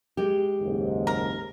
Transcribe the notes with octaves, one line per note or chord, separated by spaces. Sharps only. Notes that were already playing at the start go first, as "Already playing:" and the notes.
G#3 G4
F#1 D#2 G#2
A#4